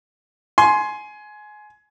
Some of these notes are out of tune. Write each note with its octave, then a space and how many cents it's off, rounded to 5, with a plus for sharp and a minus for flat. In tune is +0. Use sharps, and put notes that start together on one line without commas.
G#5 +20 C6 +0